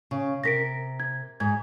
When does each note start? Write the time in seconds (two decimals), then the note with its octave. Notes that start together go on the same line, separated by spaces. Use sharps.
0.11 C#3
0.44 C3 A#4 A#6 B6 D7
1.00 G#6
1.40 G#2 G#6